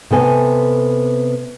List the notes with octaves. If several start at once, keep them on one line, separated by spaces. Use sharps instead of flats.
C3 B3 A4 G#5